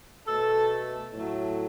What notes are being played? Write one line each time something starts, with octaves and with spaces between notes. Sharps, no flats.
B2 A3 A4
A2 F#3 A3